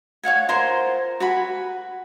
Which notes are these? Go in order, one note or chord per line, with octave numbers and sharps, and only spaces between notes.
C#5 F5 F#5 G#5
F4 A#4 C5 C6
F#4 G#5 B5